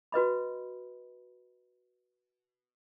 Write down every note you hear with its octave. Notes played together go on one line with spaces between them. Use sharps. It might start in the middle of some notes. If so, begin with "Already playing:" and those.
F#4 B4 D#5 B5